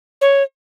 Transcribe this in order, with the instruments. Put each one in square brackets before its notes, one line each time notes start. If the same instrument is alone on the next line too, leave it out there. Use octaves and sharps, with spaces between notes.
[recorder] C#5